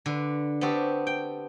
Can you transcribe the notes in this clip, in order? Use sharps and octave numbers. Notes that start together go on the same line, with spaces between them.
D3 B4
B3 C4 F#4 G4 A4
G5